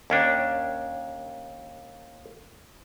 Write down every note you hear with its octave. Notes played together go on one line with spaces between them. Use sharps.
D#2 C#4 D4